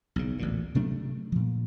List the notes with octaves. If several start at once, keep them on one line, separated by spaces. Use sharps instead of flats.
B1 C#3
A1 D2 A#2
C3 F#3 A3 D4
A#2 F3